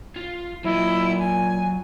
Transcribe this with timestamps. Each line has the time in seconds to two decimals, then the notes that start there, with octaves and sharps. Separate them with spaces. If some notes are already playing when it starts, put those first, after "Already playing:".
0.16 F4
0.64 A#2 F#3 E4 D#5
1.19 G#5